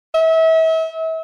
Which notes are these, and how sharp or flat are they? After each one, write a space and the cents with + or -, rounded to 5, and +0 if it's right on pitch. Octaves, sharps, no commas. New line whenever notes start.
E5 -35